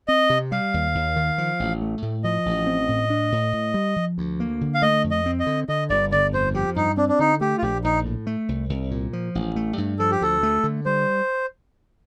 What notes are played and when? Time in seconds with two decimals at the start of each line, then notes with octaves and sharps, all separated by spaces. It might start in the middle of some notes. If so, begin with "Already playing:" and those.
0.08 C4 D#5
0.30 C3
0.52 G3 F5
0.74 D#2
0.95 D#2
1.16 D#3
1.38 F3
1.60 A1
1.81 A3
2.02 A2
2.24 F3 D#5
2.46 A1
2.66 C4
2.89 A2
3.10 D4
3.32 A2
3.53 A2
3.74 G3
3.96 F3
4.18 D2
4.40 A#3
4.61 D3
4.74 F5
4.82 A3 D#5
5.04 F2
5.11 D#5
5.26 C4
5.40 D#5
5.47 D3
5.68 D3 D#5
5.90 G1 D5
6.12 G1 D5
6.33 F2 C5
6.55 F3 G4
6.76 G2 D#4
6.97 C4 D4
7.09 D4
7.19 D3 D#4
7.41 A3 G4
7.58 F4
7.62 A#1 G4
7.84 A#1 D#4
8.05 A2
8.27 A3
8.49 C2
8.70 C2
8.91 A#2
9.13 F3
9.35 A1
9.56 A3
9.78 G2
9.99 F3 A4
10.11 G4
10.21 D2 A4
10.43 A3
10.64 D3
10.86 G3 C5